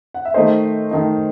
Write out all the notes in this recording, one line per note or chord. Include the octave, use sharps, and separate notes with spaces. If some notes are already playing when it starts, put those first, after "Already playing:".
F#5
E5
D#3 A3 D#4 C5 D#5
D#3 A3 D#4